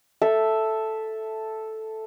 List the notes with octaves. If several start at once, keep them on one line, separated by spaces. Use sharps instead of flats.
A4 E5